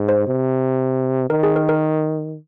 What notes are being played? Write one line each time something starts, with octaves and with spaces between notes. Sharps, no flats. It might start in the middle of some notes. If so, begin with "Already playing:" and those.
Already playing: G#2
C5
C3
D#3 A#4
G#4
A#4
A#4